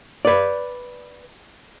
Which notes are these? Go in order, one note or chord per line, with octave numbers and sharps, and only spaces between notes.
B4 D5